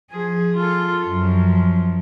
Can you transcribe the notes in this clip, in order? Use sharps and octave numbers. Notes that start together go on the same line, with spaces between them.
F3 G#4
F4 A4
F#2 F3